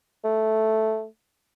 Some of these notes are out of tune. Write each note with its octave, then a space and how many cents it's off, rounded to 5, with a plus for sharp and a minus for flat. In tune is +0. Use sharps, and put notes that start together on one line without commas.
A3 -5